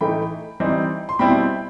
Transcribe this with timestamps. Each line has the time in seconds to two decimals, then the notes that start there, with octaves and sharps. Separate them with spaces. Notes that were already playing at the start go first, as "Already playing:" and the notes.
0.01 A2 E3 A3 D#4 G5 B5
0.60 E3 G3 C4 D#4
1.09 C6
1.19 B2 G3 C4 E4 G5 B5